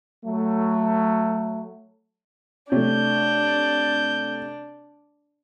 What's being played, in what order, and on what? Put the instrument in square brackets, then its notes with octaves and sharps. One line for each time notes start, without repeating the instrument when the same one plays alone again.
[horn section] F#3 A3
[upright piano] C3 [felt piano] A3 C#5 [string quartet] D4 [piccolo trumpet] G6